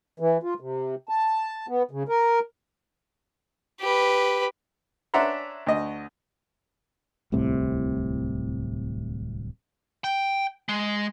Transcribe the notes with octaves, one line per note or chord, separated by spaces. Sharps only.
E3
F4
C3
A5
B3
C#3
A#4
G4 B4
C#4 D4 E5 F#5 A#5 C6
D2 D#5
D1 C2 A2 C3
G5
G#3